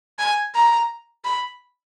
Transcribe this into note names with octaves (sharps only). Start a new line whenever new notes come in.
G#5
A#5
B5